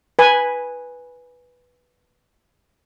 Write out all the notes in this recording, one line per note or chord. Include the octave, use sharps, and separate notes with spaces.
B4 G#5